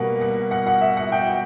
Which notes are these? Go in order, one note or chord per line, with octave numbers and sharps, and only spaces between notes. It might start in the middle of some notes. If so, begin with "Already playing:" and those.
Already playing: B2 G3 A#3 F#5
F#5
F#5
F#5
E5
F#5
G5